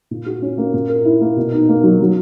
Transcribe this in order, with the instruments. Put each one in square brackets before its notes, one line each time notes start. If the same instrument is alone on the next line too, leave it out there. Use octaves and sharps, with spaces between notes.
[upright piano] A#2
F#4
C#4
A#3
A#2
A#4
E4
A#3
B2
D#4
A#3
F#3
F#3